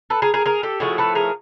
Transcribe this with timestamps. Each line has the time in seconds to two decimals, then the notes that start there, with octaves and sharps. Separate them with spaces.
0.10 A4 B4
0.22 G#4 A#4
0.34 G#4 A#4
0.46 G#4 A#4
0.63 G4 A4
0.80 A2 F3 A3 F#4 G#4
0.98 A4 B4
1.15 G#4 A#4